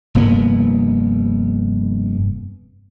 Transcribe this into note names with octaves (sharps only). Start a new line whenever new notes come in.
F1 G2 A#3 B3